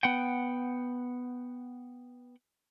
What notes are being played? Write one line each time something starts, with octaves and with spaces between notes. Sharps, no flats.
B3 F#5 G5